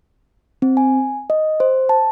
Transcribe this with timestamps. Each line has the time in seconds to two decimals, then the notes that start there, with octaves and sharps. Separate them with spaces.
0.62 C4
0.77 G#5
1.30 D#5
1.60 C5
1.89 A5